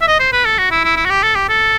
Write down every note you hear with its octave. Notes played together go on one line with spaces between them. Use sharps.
E5
D#5
C5
B4
A4
F#4
E4
E4
E4
F#4
G4
A4
G4
A4